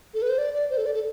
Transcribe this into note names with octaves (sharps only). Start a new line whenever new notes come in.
A4
B4
C5
D5
D5
C5
A4
D5
A4